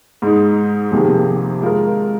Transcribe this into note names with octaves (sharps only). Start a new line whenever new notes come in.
G#2 G#3 D#4
F2 C3 D#3 A#3 G#4
G#3 F4 A#4